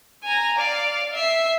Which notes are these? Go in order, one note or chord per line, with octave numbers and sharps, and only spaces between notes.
G#5 A#5
D5 F5
E5 C7